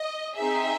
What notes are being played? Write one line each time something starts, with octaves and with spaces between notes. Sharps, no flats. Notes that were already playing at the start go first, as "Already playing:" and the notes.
Already playing: D#5
C4 D#4 G#4 E5